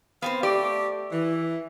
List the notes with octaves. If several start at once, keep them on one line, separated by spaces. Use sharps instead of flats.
B3 C4 C5 F5
A3 G4 D5
E3